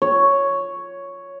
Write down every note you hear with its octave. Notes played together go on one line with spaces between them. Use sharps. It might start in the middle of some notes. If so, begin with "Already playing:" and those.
C#5